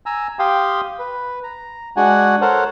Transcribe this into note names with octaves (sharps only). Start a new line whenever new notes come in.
G#5 A#5 E6
G4 F5 G5 C6 D#6
B4
A#5
G#3 D4 F#4 F#5 G#5
A4 A#4 C5 C#5 F#5